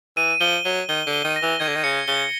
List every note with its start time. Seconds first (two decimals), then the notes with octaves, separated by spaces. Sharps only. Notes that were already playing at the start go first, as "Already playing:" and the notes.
0.17 E3 D#7
0.41 F3 G7
0.65 F#3 G7
0.89 D#3 G7
1.07 D3
1.13 G7
1.24 D#3
1.36 A#6
1.43 E3
1.60 D#3 G#6
1.68 D3
1.75 D#3
1.84 C#3 C#7
2.08 C#3 G7